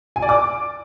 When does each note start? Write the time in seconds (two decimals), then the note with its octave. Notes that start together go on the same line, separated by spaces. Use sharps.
0.16 G#5
0.22 D5
0.29 D6